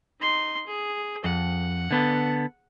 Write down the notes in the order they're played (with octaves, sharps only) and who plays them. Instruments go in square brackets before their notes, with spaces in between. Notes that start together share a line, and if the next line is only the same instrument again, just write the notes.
[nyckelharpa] D#4 C6
G#4
[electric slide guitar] F2 [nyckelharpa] F#5
[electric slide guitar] D3 B3 A4